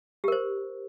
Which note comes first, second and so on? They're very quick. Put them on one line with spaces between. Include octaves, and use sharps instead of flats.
G4 A#4 C5